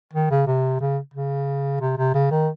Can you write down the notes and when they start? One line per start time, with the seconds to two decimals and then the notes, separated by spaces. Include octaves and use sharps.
0.14 D#3
0.31 C#3
0.47 C3
0.80 C#3
1.14 C#3
1.81 C3
1.98 C3
2.14 C#3
2.31 D#3